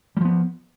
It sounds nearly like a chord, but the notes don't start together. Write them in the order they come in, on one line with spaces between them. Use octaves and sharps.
G3 F3 B3